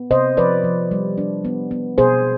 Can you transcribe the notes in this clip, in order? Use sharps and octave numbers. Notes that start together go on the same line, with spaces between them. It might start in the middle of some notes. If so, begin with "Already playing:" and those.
Already playing: B3
C3 C5 D#5
F3 B4 D5
F3
G3
D4
B3
B3
B2 G#4 C5